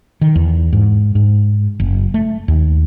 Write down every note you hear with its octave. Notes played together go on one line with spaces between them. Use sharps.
D#3
E2
G#2
G#2
F#1
A3
D#2